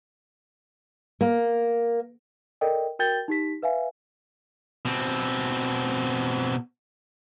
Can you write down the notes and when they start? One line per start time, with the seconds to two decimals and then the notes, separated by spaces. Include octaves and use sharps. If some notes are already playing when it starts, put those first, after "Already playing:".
1.21 A#3
2.61 A4 A#4 D5 D#5 G5
2.99 F#4 A#4 G5 G6 A6 G7
3.28 D#4 G4 B6
3.63 B4 E5 F5 G#5
4.85 B2 C4